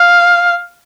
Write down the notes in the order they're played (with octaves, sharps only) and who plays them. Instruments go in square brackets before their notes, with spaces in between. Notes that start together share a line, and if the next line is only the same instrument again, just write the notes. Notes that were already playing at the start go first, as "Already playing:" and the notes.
Already playing: [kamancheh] F5